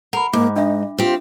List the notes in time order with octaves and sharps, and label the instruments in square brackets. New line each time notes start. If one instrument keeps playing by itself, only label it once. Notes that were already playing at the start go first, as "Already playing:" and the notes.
[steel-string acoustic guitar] A#4 [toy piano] F#5 B5
[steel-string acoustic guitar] G#2 [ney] A#3 [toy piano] D6
[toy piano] D4 E5 [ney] D#5
[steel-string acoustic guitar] C4 G4 [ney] F4